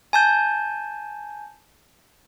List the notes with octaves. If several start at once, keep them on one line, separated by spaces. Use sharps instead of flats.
G#5 A5 G6